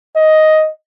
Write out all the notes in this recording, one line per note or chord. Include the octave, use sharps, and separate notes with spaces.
D#5